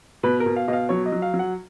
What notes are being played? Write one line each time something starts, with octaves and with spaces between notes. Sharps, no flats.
B2 B4
A#4
B2
F5
B2 D#5
F5
F#3 C#5
D#5
F#3
F5
F#3
F#5